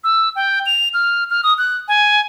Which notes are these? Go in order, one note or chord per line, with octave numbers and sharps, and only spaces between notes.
E6
G5
F7
F6
F6
D#6
F#6
G#5